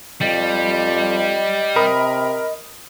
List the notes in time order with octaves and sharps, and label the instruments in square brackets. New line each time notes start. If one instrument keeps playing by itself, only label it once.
[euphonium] F2 [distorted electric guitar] G3 [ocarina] D#5
[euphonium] C3 [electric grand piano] A#4 B5 D#6